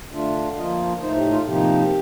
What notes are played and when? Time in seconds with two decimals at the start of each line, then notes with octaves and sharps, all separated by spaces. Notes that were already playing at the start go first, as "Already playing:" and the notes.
0.12 D3 A3 D4 F4
0.53 F5
0.57 F3 A#3 F4 D#5
1.02 A2 A3 D#4 C5
1.16 G4
1.31 F4
1.46 C3 F3 A#3 D#4 G4